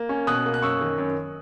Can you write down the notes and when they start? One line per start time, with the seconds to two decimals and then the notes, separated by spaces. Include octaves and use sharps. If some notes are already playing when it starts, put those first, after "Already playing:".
Already playing: A#3
0.09 C#4
0.27 B2 D#6 F#6
0.46 A#3
0.54 F#6
0.62 F#2 C#6 E6
0.81 D#3
0.98 F#2